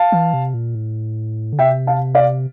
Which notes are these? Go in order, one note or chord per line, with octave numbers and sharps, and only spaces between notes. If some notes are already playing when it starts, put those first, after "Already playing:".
Already playing: F5 A5
E3
C3
A#2
A2
D3
C3 E5 G5
F5 A5
D5 F5